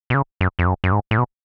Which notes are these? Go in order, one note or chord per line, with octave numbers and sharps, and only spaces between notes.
B2
C#3
F#2
F2
F#2
F#2
G#2
A2
B2